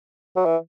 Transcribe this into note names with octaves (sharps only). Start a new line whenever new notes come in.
F#3
E3